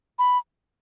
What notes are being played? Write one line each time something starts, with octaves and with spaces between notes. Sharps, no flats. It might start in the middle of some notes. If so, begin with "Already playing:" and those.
B5